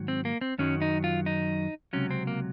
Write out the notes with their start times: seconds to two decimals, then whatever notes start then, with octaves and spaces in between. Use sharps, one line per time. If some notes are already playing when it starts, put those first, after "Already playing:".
Already playing: G#2 D#3 F#3
0.08 C4
0.25 A#3
0.41 C4
0.58 F#2 D#3 F#3 C#4
0.82 D#4
1.04 F4
1.26 D#4
1.93 C#2 C3 F#3 C#4
2.11 C4
2.27 A#3